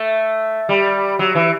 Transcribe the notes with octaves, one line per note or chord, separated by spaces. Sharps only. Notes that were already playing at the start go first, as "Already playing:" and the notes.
Already playing: A3
G3
F#3
E3